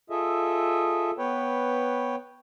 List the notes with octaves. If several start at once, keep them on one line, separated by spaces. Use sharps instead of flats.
F4 G#4 A4 D#5 E5
B3 B4 C#5 G5